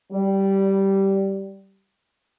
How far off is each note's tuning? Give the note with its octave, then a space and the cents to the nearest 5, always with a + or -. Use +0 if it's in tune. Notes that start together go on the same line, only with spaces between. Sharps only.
G3 -10